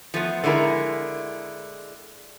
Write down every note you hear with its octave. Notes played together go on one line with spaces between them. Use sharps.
F3 A3 B3
D3 G#3 E4 G#4 A#4